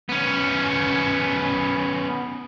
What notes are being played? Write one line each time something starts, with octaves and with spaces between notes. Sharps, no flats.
B3 C#4